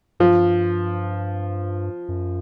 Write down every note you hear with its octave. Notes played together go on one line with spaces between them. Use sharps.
G2 F3
F#2